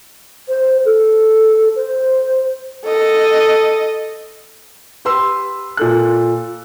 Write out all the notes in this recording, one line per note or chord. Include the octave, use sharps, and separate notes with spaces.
C5
A4
C5
A4 D#5
G4 B4 C6 E6
A#2 A4 F#6